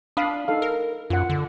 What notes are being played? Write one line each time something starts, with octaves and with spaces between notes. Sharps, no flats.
D4 F5 B5 D#6
D#4 A4 F5
A#4
F#2 F4 F#5
D3